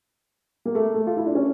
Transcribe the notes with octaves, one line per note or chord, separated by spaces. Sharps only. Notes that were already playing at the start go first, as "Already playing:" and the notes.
A#3
A3
A3
F4
E4
D4
C#4